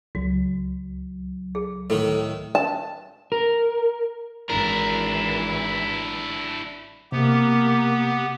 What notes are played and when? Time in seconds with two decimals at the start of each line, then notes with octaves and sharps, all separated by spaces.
0.15 C#2 F#3 F#4
1.55 G#4
1.90 A2 D#3 A4
2.55 A5
3.32 A#4
4.50 G#1 E3 D4 E4 A#4
7.12 C3 A#3 B3 G4